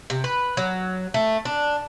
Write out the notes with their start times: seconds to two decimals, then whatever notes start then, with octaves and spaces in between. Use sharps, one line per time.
0.10 C3
0.24 B4
0.57 F#3
1.14 A3
1.45 D4